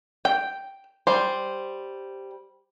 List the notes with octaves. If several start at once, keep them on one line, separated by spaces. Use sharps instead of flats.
G5
G3 C5